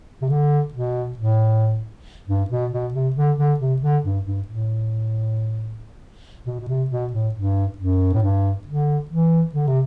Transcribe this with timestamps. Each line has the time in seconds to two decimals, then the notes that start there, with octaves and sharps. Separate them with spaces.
0.22 C3
0.29 D3
0.73 B2
1.18 A2
2.28 G2
2.50 B2
2.72 B2
2.94 C3
3.16 D3
3.38 D3
3.60 C3
3.82 D3
4.04 G2
4.26 G2
4.48 A2
6.46 B2
6.60 B2
6.68 C3
6.90 B2
7.13 A2
7.35 G2
7.78 F#2
8.14 A2
8.22 G2
8.67 D3
9.10 E3
9.55 D3
9.67 C3